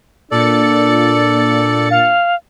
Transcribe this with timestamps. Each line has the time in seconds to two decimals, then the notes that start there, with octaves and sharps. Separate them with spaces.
0.31 A#2 D4 A4 D5 A6 C#7
1.90 F5